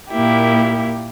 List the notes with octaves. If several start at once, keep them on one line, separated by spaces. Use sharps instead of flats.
A#2 A#3 E4 G4